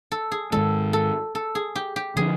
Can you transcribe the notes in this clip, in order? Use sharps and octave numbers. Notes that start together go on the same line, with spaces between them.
A4
G#4
G#2 D#3 G#3 A4
A4
A4
G#4
G4
G4
D3 F3 A#3 D4 G#4